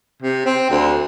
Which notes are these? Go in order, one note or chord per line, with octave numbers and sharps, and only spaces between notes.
C3
C4
D2